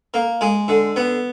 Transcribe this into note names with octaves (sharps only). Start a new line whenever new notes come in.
A#3
G#3
D3
B3